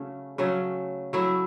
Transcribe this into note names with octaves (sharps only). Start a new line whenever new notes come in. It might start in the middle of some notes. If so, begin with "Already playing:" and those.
Already playing: C#3 F#3 A3 C#4
C#3 F#3 A3 C#4
F#3 A3 E4